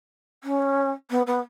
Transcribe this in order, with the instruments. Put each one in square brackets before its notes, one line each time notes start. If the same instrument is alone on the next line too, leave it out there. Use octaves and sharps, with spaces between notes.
[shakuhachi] C#4
B3
B3